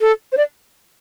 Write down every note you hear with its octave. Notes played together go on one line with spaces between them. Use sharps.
A4
C5
D5